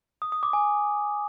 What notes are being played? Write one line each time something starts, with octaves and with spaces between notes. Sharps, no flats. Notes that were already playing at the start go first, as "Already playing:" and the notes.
D#6
D#6
D6
G#5